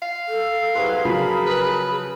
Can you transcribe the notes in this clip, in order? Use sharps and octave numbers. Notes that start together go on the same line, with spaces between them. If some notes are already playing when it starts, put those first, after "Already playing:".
F5
A4
C2 F#3 G#4 B4 C6
C#3 F3 F#3 A#4 A5 B5
B4